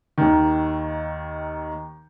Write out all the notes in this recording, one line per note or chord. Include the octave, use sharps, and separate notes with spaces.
D#2 D#3